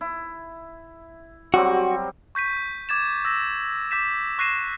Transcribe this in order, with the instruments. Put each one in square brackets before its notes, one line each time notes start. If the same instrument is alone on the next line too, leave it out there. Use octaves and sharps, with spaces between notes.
[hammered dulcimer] E4
[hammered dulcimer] F#3 G3 C4 [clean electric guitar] F#4
[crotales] C#6 G6 B6 D#7
D6 G#6 A6 E7
E6 A#6
D6 G6 B6 E7
C#6 F#6 A#6 C7 D#7 E7